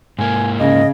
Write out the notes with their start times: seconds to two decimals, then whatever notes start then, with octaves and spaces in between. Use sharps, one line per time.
0.19 G#2 A#3 G#5
0.59 C#3 D#5